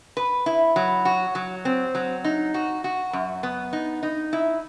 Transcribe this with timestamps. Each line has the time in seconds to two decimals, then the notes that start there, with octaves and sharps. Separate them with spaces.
0.17 B4
0.46 E4
0.76 F#3
1.05 F#4
1.35 F#3
1.65 C4
1.95 F#3
2.24 D#4
2.54 F#4
2.84 F#4
3.13 F#2
3.43 B3
3.73 D#4
4.03 D#4
4.33 E4